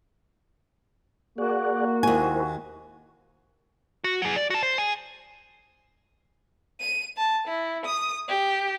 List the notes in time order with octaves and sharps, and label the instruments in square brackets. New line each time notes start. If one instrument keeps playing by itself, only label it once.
[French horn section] A#3 [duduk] F#4 [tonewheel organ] G#4 D5 F#5
[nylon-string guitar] D#2 G#5 [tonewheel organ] E4 A#4 C5
[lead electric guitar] F#4
F#3 G#4
D5
F#4 A5
C5
G#4 G#5
[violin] D#7
A5
E4
D#6
G4